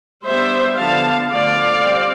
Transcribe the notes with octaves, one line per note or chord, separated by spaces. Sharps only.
G3 B3 D4 C5 E5
D3 F3 B3 D4 F5 A5
D3 F3 A3 D5 F5
G3 C4